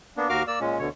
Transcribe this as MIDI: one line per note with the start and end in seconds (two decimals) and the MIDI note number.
0.17 0.28 58
0.17 0.28 59
0.17 0.28 62
0.29 0.43 39
0.29 0.43 66
0.29 0.43 70
0.29 0.43 77
0.29 0.43 86
0.29 0.43 89
0.47 0.59 58
0.47 0.59 74
0.47 0.59 88
0.60 0.78 46
0.60 0.78 56
0.60 0.78 61
0.79 0.89 38
0.79 0.89 47
0.79 0.89 50
0.79 0.89 73